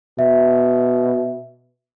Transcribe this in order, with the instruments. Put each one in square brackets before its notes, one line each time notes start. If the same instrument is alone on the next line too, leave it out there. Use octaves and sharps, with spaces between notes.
[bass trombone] B2 [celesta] E5